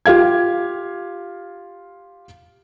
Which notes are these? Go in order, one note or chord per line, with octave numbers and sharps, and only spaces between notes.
F4 G4 F5 G#6